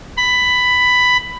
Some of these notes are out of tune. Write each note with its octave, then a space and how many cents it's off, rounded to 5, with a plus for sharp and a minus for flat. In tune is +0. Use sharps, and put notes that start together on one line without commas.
B5 +10